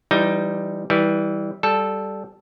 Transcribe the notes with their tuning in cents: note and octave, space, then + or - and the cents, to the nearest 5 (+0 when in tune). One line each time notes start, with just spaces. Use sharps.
E3 +25 G3 +0 D#4 +5
E3 -20 G3 +0
G3 +0 A4 -5